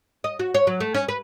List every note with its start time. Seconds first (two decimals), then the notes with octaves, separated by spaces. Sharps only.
0.24 D#5
0.39 F#4
0.54 C#5
0.67 F#3
0.80 A3
0.95 C#4
1.09 B4